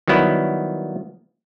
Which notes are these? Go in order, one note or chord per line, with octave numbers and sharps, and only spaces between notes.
D#3 F#3 G3 B3 E4